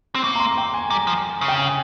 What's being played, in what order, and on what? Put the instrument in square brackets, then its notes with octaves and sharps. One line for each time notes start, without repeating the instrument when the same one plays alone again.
[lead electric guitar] C4
[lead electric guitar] A#3 [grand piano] C#6
[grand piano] A#5
C6
G5
G#5
[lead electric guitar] G3 [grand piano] A#5
[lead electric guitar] F3
C#3
[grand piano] G5
G#5